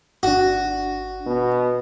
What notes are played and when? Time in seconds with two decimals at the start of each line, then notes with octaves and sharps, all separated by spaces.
0.23 G1 D4 F#4
1.27 B2